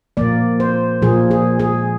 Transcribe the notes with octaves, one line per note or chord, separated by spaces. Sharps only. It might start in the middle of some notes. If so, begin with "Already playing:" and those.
A#2 F3 A#3 D5
C5
A#2 F3 A#3 G#4
G#4
G#4